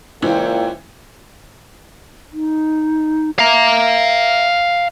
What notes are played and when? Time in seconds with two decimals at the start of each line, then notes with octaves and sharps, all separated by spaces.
0.23 C#2 A#2 E3 C5 G5
2.33 D#4
3.39 E5 F5 A#5